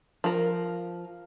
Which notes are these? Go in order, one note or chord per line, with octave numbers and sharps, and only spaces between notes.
F3 A#4